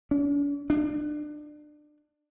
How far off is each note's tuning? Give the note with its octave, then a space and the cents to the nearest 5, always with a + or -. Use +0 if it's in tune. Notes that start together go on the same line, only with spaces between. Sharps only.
D4 -45
D4 +25